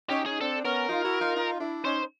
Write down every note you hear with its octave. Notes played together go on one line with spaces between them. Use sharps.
C#4 D#4 G4
C#4 D#4 G#4
C4 D4 A4
B3 C#4 A#4
D#4 F4
E4 F#4
D#4 F4
D#4 F4
D4 E4
C#4 D#4 C5